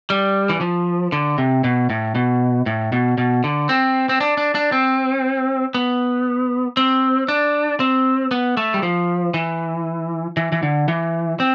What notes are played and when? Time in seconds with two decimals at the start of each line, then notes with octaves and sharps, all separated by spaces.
0.10 G3
0.49 E3
0.61 F3
1.12 D3
1.38 C3
1.64 B2
1.90 A2
2.15 B2
2.66 A2
2.92 B2
3.18 B2
3.44 D3
3.69 C4
4.09 C4
4.20 D4
4.37 D4
4.55 D4
4.72 C4
5.74 B3
6.77 C4
7.28 D4
7.80 C4
8.31 B3
8.57 A3
8.74 G3
8.83 F3
9.34 E3
10.37 E3
10.52 E3
10.63 D3
10.88 E3
11.40 C4